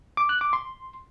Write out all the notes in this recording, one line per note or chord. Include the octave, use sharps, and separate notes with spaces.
D6
F#6
D6
C6